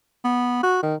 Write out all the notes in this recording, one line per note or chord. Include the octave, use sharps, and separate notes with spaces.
B3
F#4
D#3